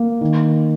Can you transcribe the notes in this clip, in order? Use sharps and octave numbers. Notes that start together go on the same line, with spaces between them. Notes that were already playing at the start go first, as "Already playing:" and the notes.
Already playing: A#3
D#3